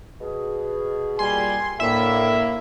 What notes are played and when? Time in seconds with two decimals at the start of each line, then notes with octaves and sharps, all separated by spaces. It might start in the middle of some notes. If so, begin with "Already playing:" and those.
0.20 B2 G#4
1.19 A#2 G3 G#5 C6
1.80 D2 A2 A#3 E4 E5